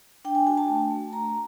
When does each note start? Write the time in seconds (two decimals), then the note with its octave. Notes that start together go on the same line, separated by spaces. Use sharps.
0.25 D4 G5
0.35 G#5
0.47 F#4 G#5
0.57 A5
0.68 A3
0.91 A3
1.13 F#4 A#5